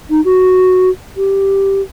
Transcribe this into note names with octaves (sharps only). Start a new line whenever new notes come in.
D#4
F#4
G4